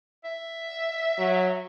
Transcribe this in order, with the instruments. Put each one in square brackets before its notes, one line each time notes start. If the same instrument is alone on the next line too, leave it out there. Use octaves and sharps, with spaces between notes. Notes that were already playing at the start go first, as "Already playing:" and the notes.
[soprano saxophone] E5
[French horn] F#3